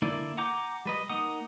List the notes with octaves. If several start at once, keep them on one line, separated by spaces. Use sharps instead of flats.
D3 A#3 E4 D5
F#5 G#5 A#5 D6 G6
G3 B4 D#5
A#3 D#4 F#5 D#6